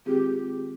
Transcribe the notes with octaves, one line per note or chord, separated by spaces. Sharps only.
D#3 G#3 C4 F4 G4 G#4